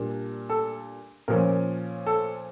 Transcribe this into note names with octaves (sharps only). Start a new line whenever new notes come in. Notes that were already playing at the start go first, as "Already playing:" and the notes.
Already playing: A#2 G3 A#3 D4
A4
A#2 F3 C#4 A#4
A4